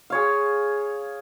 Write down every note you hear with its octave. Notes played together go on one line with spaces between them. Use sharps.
G#4 C#5 F5